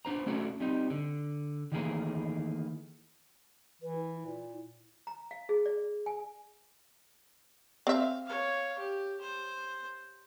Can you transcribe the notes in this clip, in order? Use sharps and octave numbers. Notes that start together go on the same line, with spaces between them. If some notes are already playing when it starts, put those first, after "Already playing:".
B3 D4 C5 A#5
A3 C#4 D4 F#4 A4
G3 C4 D#4
D3
D#3 E3 A3 A#3 G#4 A#4
E3 B4
E4
A#2 E4
A#5
F5
G#4
D5
G#5
C4 E5 F5
C#5 F5
G4
C5